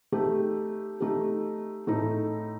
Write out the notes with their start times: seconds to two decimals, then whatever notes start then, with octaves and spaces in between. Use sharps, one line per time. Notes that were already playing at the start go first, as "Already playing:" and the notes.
0.12 A3 D#4 G4
1.00 A3 D#4 G4
1.87 A2 A3 D#4